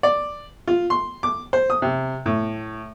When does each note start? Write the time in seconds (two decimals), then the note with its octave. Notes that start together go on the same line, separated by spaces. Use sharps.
0.03 D5
0.67 F4
0.90 C6
1.23 D6
1.53 C5
1.70 D#6
1.82 C3
2.26 A2